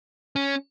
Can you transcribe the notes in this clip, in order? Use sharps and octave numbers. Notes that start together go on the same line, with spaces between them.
C#4